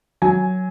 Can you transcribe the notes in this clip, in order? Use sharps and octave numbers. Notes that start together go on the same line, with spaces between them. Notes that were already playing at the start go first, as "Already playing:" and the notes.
F#3 G#5